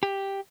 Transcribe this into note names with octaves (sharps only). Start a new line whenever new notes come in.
G4